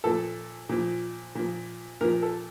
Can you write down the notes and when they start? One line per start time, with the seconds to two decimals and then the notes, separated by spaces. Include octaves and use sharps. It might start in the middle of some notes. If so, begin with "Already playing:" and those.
0.04 A#2 F3 A4
0.69 A#2 F3
1.35 A#2 F3
2.01 A#2 F3 A#4
2.22 A4